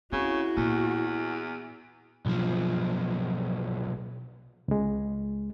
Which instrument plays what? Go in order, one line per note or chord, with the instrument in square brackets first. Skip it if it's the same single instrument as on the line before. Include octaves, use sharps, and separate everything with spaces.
[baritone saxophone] C#3 [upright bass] C4 [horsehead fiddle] E4 F#4
[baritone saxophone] E2 [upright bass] A#2
[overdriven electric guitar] B1 F3
[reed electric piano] C#2 G#3